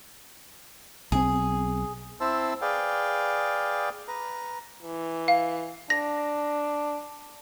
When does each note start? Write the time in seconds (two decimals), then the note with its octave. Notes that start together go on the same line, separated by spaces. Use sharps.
1.12 B1 C4 G#4
2.20 C4 E4 C5 A5 E6
2.61 G#4 B4 D5 F5 G5
4.08 B4 A#5
4.83 E3
5.28 F5
5.90 D4 A#6